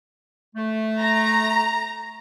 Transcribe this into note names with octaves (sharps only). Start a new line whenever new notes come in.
A3
A#5